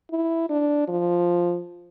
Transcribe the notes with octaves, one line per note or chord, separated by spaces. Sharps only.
E4
D4
F3